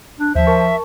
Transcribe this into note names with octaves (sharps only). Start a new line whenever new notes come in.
D4
D#2 F3 C5 E5
A#4 A5 C#6